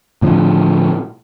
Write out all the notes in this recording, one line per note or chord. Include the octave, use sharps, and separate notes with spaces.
A2 D3 F3